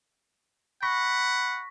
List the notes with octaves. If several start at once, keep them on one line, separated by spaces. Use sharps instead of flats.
F#5 B5 C#6 A#6 B6